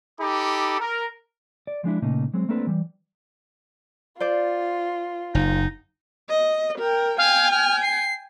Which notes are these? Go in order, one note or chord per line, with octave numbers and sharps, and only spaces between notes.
D#4 G4 A4 B5 D6
A#4
D5
F3 G#3 D4 E4
A#2 C#3 A3 A#3 D#4
F#3 G#3 C4
A3 A#3 C4 D4 A4 B4
E3 G3
F4 C5 D5
F#1 D#4
D#5
A#4 G5
F5 G5 G#5
F6
C7